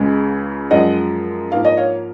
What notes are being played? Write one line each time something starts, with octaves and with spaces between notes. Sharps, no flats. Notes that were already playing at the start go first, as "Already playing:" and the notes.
Already playing: C#2 C#3 G#3
F#2 F3 G#3 D#5 F#5
G#2 F3 A#3 F5
D#5
C#5 F5